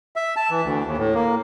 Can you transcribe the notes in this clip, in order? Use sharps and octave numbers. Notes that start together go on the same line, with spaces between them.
E5
A5
E3
D2
D#2
A2
A#3